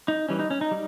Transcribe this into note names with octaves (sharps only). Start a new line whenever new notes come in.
D#4
E3 G3 C#4
D#4
C#4
D#4
G3